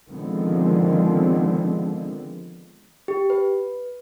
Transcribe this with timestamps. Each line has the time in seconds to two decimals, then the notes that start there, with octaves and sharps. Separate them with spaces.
0.10 D3 D#3 F3 G#3 B3 C4
3.08 G4
3.30 B4